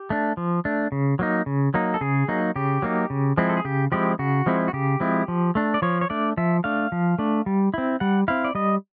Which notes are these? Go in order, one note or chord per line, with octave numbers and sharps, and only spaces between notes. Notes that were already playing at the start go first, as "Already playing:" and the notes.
Already playing: G4
A3 D4
F3
A3 D4
C#3
F#3 A#3 D#4
C#3
F#3 A#3 D#4
A4
C#3 G#4
F#3 A#3 D#4
C#3 G4
F#3 A#3 D#4
C#3
F3 G#3 C4 E4
A4
G#4
C#3 G4
F3 G#3 C4 E4 G4
C#3 F#4
F3 G#3 C4 E4
F#4
C#3 G4
F3 G#3 C4 E4
F3
A3 D4
D5
F3 C#5
C#5
A3 D4 D5
F3 E5
A3 D4 F5
F3
A3 D4
G3
C4 E4
G3 F#5
C4 E4 F5
D5
G3 D#5